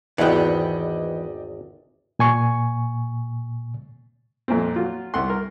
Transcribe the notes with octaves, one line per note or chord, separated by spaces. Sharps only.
G#1 E2 E3 B3 D5 D#5 G5
A#2 G#5 C#6
F2 A#2 A#3 C4
F#3 F4
C2 F#5 C6
A#4